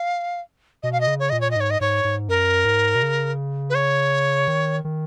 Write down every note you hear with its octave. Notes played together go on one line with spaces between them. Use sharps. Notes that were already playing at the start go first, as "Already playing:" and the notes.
Already playing: F5
B2 D#5
F5
D#5
C#3
C#5
A#2 D#5
C#5
D#5
G#2 C#5
D#5
G#2 C#5
G#2
F#2 A#4
G#2
B2
C#3
B4
C#5
D#3
D#3